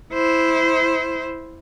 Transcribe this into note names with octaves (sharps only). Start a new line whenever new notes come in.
E4 C5